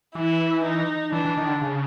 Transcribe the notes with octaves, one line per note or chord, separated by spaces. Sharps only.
E3 E4
D#4
E3 D4
E3
D#3
D3
C#3